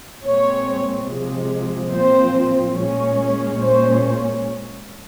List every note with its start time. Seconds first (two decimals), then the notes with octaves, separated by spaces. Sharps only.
0.24 A#2 G#3 C4 C#5
1.07 C3 F3 G#3
1.91 A#2 F3 C4 C5
2.74 A#2 G#3 C#4
3.57 A#2 G#3 C#4 C5